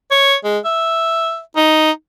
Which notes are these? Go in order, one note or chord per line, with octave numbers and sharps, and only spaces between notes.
C#5
G#3
E5
D#4